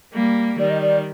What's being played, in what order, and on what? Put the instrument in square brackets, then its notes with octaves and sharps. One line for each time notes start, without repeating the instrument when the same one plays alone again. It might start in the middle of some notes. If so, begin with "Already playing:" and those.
[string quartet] G3 A#3
[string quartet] D#3 G3 [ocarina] D5
[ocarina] D#5
D5